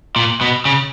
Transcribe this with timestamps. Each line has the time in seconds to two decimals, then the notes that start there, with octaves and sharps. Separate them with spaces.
0.16 A#2
0.41 B2
0.65 C#3